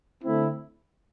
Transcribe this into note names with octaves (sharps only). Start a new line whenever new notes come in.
D3 A3 C4 E4